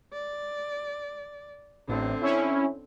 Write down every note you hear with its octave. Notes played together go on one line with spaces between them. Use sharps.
D5
A1 A2 D3 C4
C#4 E4